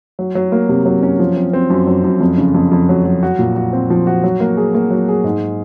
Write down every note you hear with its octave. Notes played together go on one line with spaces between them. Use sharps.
F#3
F#3
A#3
C3
F#3
C#4
F3
C4
C4
F#2
F#2
F#2
F2
C#3
F2
F2
F#3
F#3
F#4
A#2
F#4
C4
F3
F#4
F#3
A#3
G#4
A#3
F#3
G#4
G#2